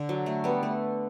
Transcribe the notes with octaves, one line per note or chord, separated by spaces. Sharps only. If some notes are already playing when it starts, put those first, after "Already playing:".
Already playing: D3
F#3
A3
G3 B3
A3